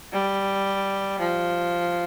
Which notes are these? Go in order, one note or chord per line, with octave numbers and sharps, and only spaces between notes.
G3
F3